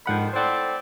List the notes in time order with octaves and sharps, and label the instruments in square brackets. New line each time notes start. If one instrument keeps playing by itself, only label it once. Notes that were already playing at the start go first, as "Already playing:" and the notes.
[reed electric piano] G#2 F#5 B5 [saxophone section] D3 D#3 F3
[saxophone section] A2 C4 D5 [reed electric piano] C5 F#5